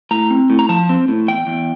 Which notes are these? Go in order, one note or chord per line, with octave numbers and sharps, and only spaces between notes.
A2 A#5
C4
A2
A#5
F3 A5
C4
A2
E2 G5
E2